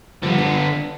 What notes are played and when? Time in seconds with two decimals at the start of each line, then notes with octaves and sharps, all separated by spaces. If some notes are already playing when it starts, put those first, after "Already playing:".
0.23 D3 F3 G3 B3
0.38 D4